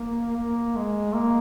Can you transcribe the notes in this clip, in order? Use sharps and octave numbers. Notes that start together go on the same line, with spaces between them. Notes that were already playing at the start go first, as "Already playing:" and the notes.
Already playing: A#3
A#3
G#3
A#3